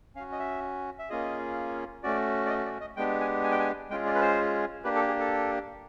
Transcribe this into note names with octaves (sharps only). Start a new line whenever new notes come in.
C#4 F#4 F5
D#5
E5
E5
A#3 C#4 F4 G#4 D#5
A3 C#4 F#4 D5
D5
D#5
D5
D#5
G#3 B3 D4 G4 G5
G#5
G#5
G5
G#5
G#3 C#4 F4 G#4 G5
D5
B4
C5
A#3 D4 G4 B4
A4
G#4
A4